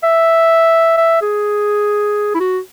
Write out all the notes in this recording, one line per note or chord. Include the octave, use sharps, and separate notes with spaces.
E5
E5
G#4
E4
F#4